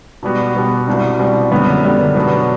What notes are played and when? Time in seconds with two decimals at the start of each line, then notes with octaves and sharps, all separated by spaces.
0.23 B2 G3 B3 F#4
0.54 B2 G3 B3 F#4
0.87 C2 B2 G3 C4
1.19 C2 B2 G3 C4
1.51 F#2 D3 G3 B3
1.84 F#2 D3 G3 B3
2.15 B2 F#3 B3 D4